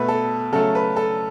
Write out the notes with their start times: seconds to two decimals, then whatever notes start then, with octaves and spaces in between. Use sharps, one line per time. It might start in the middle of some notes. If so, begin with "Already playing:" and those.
Already playing: B2 A3 B4
0.08 A4
0.52 C#3 F#3 A3 A4
0.75 B4
0.96 A4